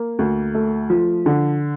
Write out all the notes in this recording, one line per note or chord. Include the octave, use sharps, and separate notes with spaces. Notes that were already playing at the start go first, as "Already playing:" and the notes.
Already playing: A#3
D2
A3
F3
D3